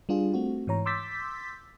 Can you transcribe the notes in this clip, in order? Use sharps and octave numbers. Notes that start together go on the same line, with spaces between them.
G3 D4 F4 G#4
A3 C4 F#4
G#2 E3 C#5 A#5
C6 D6 E6 G6 A6 B6